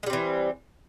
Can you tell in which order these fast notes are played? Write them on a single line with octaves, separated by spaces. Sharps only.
G#3 G3 C4 E3